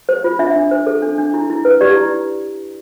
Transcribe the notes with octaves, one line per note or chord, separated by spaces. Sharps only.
C5
F4
D4 E5
D4
C5
A4
D4
D4
E4
E4
B4
G4 D5
E4